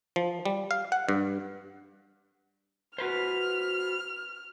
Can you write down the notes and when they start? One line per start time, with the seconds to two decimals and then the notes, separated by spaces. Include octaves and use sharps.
0.16 F3
0.45 G3
0.71 F5
0.92 F#5
1.09 G2
2.98 F#4 B4 C5 F6